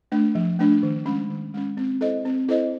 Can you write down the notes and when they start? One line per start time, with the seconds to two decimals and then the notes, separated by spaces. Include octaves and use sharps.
0.12 A3 D4
0.35 F3
0.59 A3 D4
0.83 D#3
1.06 G#3 C#4
1.30 D#3
1.54 G#3 C#4
1.77 C4
2.01 E4 A4 C5 D#5
2.25 C4
2.49 E4 A4 C5 D#5